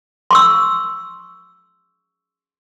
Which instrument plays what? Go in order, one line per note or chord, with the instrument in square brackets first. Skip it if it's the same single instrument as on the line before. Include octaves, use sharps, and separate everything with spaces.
[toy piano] C6 C#6 E6